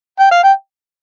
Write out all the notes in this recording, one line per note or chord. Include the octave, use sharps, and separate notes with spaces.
G5
F5
G5